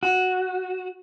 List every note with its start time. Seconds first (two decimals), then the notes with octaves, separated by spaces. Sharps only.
0.03 F#4